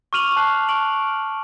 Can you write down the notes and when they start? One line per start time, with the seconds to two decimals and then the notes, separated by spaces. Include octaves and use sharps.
0.13 C#6 D6 F6 D#7 F7 F#7
0.36 A5 F#6 C7 F#7
0.69 C#6 F6 D7 F#7